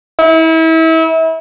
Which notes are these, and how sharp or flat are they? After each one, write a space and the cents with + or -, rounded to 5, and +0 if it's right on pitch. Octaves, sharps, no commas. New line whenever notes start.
E4 -35